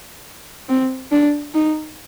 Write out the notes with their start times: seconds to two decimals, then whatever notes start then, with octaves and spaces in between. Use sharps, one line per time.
0.69 C4
1.12 D4
1.54 D#4